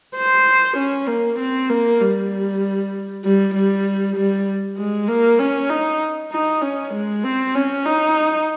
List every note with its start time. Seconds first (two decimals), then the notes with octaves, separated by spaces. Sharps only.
0.16 C5
0.77 C#4
1.08 A#3
1.39 C4
1.70 A#3
2.01 G3
3.24 G3
3.54 G3
4.16 G3
4.78 G#3
5.08 A#3
5.39 C#4
5.70 D#4
6.32 D#4
6.62 C#4
6.94 G#3
7.24 C4
7.55 C#4
7.86 D#4